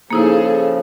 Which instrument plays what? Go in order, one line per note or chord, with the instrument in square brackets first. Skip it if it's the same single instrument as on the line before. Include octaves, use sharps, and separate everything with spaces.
[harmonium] C#3 F3 [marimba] A#3 D#4 E4 [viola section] G#4 A4